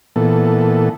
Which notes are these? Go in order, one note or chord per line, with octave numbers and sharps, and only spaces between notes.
A#2 E3 B3 A4